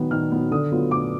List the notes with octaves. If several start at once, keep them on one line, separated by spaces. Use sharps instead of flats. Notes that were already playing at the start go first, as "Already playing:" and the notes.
Already playing: D#3 F#3 B3
D#3 F6
F#3 B3
D3 D#6
F#3 B3 F4
D3 D6